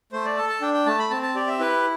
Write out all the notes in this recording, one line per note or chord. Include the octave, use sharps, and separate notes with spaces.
A3 C5
D5
A4 A5
A5
D4 G5
G5
A3 A5
B5
C4 A5
A5
G4 D5
E5
E4 B4